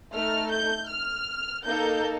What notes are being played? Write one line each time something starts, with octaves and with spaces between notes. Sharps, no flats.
A3 D#4 A4 F6
G6
F6
A#3 D#4 A4 G6